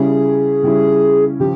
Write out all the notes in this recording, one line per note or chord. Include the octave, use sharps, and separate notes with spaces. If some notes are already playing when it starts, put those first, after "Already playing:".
Already playing: C#3 G3 C#4 E4 G#4
C#3 G3 C#4 E4
C#3 F3 G4